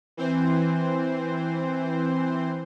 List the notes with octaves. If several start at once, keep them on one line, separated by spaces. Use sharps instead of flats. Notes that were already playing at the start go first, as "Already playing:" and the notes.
E3 C4 C5